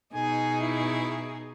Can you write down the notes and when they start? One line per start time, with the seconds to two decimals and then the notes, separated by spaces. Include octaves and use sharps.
0.14 B2 D#4 G#4 G#5
0.61 E4